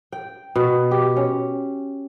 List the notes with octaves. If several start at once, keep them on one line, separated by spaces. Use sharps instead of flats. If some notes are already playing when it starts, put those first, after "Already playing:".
G5
B2
G4
C#4